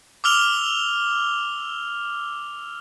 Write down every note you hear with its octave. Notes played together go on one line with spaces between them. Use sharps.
D6 E6 F6 F7 G7